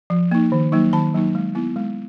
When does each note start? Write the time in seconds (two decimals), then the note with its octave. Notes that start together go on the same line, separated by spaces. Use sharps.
0.10 F3
0.31 A#3 D#4
0.52 D#3
0.72 F#3 A#3 D#4
0.93 D#3 A5
1.14 F#3 A#3 D#4
1.35 G#3
1.55 B3 E4
1.76 G#3